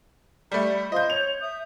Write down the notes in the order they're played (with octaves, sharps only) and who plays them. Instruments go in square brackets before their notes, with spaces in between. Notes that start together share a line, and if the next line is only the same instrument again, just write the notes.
[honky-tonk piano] G3 A3 [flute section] B5
[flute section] F4 C5 [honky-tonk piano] D#5 G6
[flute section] C#5 [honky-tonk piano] F7
[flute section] E5 D#6 G6